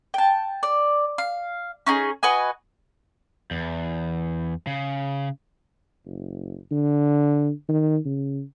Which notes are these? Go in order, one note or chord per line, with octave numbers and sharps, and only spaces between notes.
G5 A5
D5
F5
C#4 D#4 G#4
F#4 B4 D#5 G#5
E2
C#3
F#1
D3
D#3
C#3